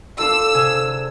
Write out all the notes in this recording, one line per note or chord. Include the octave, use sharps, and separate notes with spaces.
D4 F4 A4 E6
C3 G#4